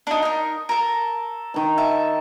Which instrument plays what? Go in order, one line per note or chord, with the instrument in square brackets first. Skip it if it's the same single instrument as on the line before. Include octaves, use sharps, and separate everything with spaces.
[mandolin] D4 D#4
D#4 A#4
A4 A#4
[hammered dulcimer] D#3 A#5
[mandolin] E5 A5